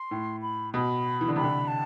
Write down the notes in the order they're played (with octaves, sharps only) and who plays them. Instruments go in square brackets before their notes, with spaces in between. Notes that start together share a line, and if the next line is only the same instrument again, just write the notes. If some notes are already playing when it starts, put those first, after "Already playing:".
Already playing: [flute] C6
[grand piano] A2
[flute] B5
[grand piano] B2 [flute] B5
[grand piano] E3
D3
[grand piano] C3 [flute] B5
[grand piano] D3
[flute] A5